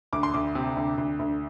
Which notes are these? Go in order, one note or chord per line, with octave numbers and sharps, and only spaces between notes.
D2 D6
C6
D2 D6
C3
D2
D2
D2